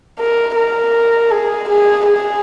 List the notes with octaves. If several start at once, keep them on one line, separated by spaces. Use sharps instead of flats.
A#4
A#4
G#4
G#4
G#4